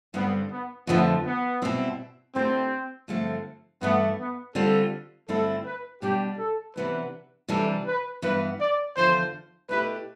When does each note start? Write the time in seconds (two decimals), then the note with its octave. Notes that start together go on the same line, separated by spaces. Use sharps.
0.14 G2 D3 G3 B3 C4
0.51 B3
0.87 F2 D3 F3 A3 B3
1.25 B3
1.62 B2 G3 C4 E4
2.35 D3 A3 C4 E4 G4
3.08 G2 D3 F3 A3 C4
3.81 G2 E3 A3 B3 E4
4.18 B3
4.55 D3 G3 C4 F4 A4
5.28 G2 D3 A3 C4 E4 A4
5.65 B4
6.02 B2 G3 D4 G4
6.39 A4
6.76 C3 E3 B3 D4 B4
7.48 C3 E3 G3 D4 A4
7.86 B4
8.22 G2 E3 B3 B4
8.60 D5
8.96 E2 D3 F3 C5
9.69 B2 A3 E4 G4 B4